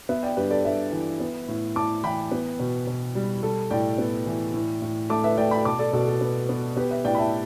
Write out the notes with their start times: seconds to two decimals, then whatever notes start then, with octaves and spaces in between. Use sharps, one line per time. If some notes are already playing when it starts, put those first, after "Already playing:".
0.09 B3 B4 E5
0.23 D5 G5
0.37 G2 G4 B4
0.50 A4 D5
0.65 G2 B4 E5
0.92 E3
1.20 B3
1.48 A2
1.76 A2 A5 D6
2.04 E3 G5 B5
2.31 B3
2.60 B2
2.87 B2
3.15 G3
3.43 G3 A4
3.71 A2 D5 G5
3.98 B3
4.27 E3
4.54 A2
4.82 A2
5.09 A3 A5 D6
5.24 B4 E5
5.37 A3 D5 G5
5.51 G5 B5
5.65 B2 A5 D6
5.79 A4 D5
5.93 B2 A4
6.07 A4
6.21 B3
6.49 B3
6.77 B3 G4 B4
6.91 B4 E5
7.05 A2 D5 G5
7.15 B5
7.18 E5 A5